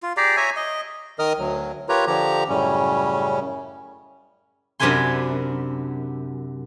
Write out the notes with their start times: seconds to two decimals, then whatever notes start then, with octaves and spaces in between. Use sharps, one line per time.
0.03 F4
0.17 G4 G#4 D5 A#5
0.37 C#5 E5 G#5 A#5
0.57 D#5
1.19 D#3 A#4 D#5 D#6 F6
1.38 D2 F#3
1.89 F4 G4 A#4 B4 C#5 A#5
2.07 D3 F3 G4 A#5
2.49 F#2 A2 C#3 G3 C#4
4.80 F#2 C3 D4 B4 G#5 C6